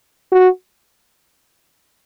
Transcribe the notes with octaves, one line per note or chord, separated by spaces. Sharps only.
F#4